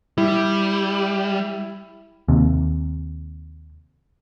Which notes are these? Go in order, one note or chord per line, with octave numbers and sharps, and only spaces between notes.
G3 E4
D#2 C3